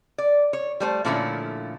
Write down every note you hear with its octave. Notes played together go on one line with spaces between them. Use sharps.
D5
C#5
G3 A3 C5
A#2 D3 F3 A3 C#4 E4